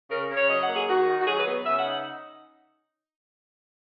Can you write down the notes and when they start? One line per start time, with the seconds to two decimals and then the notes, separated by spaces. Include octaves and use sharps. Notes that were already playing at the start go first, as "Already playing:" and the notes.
0.10 C#3 A#4
0.29 C#3
0.36 C#5
0.48 F#3 D#5
0.62 F#5
0.68 A#3
0.74 G#4
0.87 D#3 F#4
1.07 D#3
1.21 F#4
1.26 F#3 G#4
1.39 B4
1.46 B3
1.64 C#3 E5
1.78 F#5
1.84 D#4